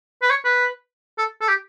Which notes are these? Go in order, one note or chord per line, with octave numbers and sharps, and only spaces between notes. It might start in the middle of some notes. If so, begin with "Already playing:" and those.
B4
C#5
B4
A4
A4
G4